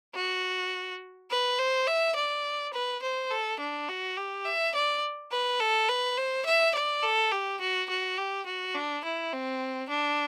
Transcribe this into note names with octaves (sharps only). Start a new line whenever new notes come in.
F#4
B4
C5
E5
D5
B4
C5
A4
D4
F#4
G4
E5
D5
B4
A4
B4
C5
E5
D5
A4
G4
F#4
F#4
G4
F#4
D4
E4
C4
D4